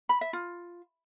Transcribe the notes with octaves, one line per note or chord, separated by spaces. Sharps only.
B5
E5
F4